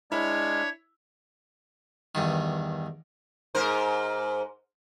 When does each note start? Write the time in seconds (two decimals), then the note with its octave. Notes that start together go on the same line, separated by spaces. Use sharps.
0.12 G#3 D4 E4 C#5 F6
2.15 E2 G2 D#3
3.55 G#2 A#4 C5